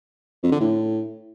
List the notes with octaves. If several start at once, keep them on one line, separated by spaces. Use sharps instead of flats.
F2
D3
A2